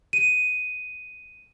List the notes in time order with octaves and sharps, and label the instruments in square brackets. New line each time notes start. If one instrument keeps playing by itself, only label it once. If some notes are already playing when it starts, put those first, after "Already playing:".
[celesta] D#7